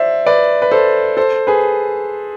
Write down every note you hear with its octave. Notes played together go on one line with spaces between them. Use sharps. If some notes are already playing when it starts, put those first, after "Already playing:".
Already playing: C5 D5 E5
B4 D5
B4
A4 C5
A4 C5
G#4 B4